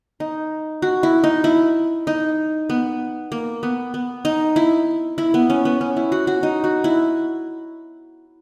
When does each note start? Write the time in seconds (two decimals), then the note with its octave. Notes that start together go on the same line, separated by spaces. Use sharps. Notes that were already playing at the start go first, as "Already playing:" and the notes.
0.20 D#4
0.82 F#4
1.03 E4
1.24 D#4
1.44 E4
2.07 D#4
2.70 B3
3.32 A#3
3.63 B3
3.94 B3
4.25 D#4
4.56 E4
5.18 E4
5.34 B3
5.50 C#4
5.65 B3
5.81 C#4
5.97 E4
6.12 F#4
6.27 F#4
6.43 D#4
6.64 F#4
6.84 E4